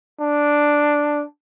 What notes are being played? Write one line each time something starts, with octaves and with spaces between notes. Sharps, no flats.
D4